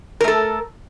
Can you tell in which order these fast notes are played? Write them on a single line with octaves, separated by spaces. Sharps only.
A#4 A3 A4